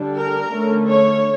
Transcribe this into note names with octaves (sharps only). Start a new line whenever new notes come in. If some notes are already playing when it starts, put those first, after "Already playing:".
Already playing: D3 G3 D4
A#4
D3 A3 C#4
C#5